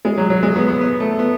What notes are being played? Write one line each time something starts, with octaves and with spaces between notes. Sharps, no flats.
G#3
F#3
F#3
G#3
B3
B3
B3
A3
B3